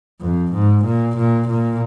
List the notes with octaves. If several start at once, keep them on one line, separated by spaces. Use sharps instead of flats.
F2
G#2
A#2
A#2
A#2